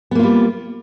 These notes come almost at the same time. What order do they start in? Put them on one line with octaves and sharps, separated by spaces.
B3 A#3 F4 G3